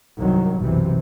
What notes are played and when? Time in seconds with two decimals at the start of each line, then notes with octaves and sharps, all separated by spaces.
0.18 C2 G2 D#3 F#3
0.59 F#1 B1 C3 E3